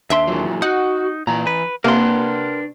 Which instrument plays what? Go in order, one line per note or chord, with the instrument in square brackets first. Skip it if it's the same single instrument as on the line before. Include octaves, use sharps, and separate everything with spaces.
[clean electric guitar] D#2 D4 C6 [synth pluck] E5
[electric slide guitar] A#2 E3 F#3
[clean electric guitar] D#4 [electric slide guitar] F#4 [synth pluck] F#5
[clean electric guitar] A#2 [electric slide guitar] E3 A#5
[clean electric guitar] B4
[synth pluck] C3 A#3 [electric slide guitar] D4 B4 F#5 [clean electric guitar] A#4 C6